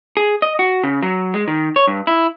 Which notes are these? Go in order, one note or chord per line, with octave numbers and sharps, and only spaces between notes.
G#4
D#5
F#4
C#3
F#3
G#3
D#3
C#5
G2
E4